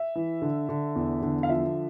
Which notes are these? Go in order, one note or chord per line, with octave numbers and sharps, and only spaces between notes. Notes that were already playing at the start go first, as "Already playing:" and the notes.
Already playing: E5
E3
D3
D3
E2
D3
F5
F3 E5